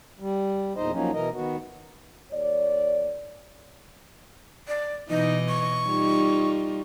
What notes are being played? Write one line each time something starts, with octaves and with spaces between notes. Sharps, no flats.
G3
E2 A#2 D#4 C5 D#5
F3 F#3 A#3 C#4 D#4
B2 E3 A#4 D#5
D#3 B3 F#4
D#2 C#5 D5
D5
B2 E3 D#4 D#5
C#6
G3 D#4 F4